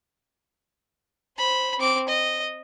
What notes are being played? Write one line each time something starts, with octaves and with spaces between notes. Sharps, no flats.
C5 B5
C4 D6
D#5